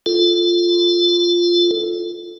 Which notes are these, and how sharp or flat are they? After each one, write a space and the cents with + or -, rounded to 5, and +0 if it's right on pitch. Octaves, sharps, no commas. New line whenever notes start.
F4 +0 A4 +0